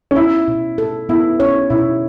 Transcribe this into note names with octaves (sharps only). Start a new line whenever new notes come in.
C#4
B3 E4
B2
A4
B3 E4
C#4 C#5
B2 E4